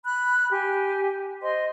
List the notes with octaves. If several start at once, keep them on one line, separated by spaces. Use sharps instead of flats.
B5 F#6
G4 G#5
C5 D#5 C6